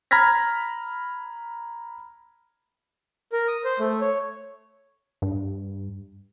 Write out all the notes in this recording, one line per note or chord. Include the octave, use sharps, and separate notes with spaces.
A#5 B5 F6 G#6 A#6 B6
A#4
D#6
C5
A3
C#5
G2